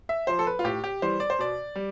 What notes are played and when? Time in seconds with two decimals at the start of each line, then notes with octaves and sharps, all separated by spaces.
0.09 E5
0.27 F3 C5
0.39 A4
0.47 B4
0.59 F4
0.64 A2 G4
0.84 G4
1.02 E3 G3 C5
1.20 D5
1.30 C5
1.39 B2 D5
1.76 G3